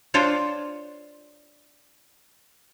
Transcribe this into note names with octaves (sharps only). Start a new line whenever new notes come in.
D4 F4 C5 C#5